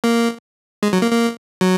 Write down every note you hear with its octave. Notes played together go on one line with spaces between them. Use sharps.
A#3
G#3
F#3
A#3
A#3
F#3